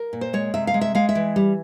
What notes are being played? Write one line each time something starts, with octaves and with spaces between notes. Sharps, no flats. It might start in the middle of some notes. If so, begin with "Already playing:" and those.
Already playing: A#4
A#2
C5
G#3 C#5
C3 E5
F5
G#3
E5
G#3 F5
E5
E3
G3